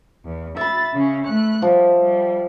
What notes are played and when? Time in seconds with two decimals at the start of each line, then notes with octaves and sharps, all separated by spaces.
0.24 E2
0.57 E5 B5 A6
0.93 C#3 C#4
1.25 A3 F#6
1.62 F3 G3
2.01 G3